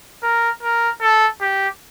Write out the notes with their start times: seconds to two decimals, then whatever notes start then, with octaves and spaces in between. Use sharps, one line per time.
0.23 A#4
0.63 A#4
1.01 A4
1.41 G4